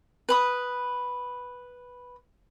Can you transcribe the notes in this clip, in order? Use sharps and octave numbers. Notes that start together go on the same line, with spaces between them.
B4 B5 D#6